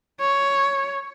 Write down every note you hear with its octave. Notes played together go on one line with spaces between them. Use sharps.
C#5